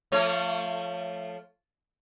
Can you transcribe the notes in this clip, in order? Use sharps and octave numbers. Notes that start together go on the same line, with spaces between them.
F3 A3 C#5